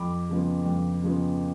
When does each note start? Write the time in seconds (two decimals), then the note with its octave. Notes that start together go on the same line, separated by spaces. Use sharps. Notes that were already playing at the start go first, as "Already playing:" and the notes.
Already playing: F2 B5 D6
0.29 C#3 F3 B3
0.66 F2
1.03 C#3 F3 B3